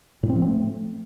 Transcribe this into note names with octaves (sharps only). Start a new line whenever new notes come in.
A2
C4
F3
C4
A3